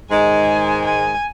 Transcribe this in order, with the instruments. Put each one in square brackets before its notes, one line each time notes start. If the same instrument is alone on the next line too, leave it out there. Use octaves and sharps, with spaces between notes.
[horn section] G#2 D#3 G#3 [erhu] G#5
[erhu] G#5